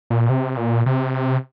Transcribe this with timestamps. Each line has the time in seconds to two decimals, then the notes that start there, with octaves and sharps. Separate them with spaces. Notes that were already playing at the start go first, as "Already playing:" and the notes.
0.10 A#2
0.29 C3
0.57 A#2
0.86 C3